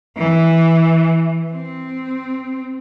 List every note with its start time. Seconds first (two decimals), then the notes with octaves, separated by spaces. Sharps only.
0.17 E3
1.52 C4